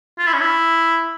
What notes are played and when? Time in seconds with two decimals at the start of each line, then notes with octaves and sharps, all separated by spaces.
0.18 F4
0.27 E4
0.34 C#4
0.41 E4